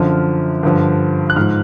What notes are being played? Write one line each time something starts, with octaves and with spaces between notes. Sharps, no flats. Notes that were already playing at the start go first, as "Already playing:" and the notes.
Already playing: F#2 D3 F3 F6
G2 D3 F3
F#6
G#2 F3 F6